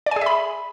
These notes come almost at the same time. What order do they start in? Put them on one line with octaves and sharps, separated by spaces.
D5 G#5 G#4 E5 B5